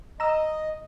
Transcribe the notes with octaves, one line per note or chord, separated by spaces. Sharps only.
D#5 A#5 E6